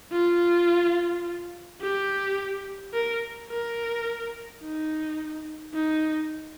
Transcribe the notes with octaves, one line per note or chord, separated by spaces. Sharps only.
F4
G4
A#4
A#4
D#4
D#4